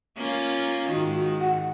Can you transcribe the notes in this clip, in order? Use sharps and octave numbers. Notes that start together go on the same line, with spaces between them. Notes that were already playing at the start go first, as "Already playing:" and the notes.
A#3 C#4 F4
G#2 D#3 F#4
F#5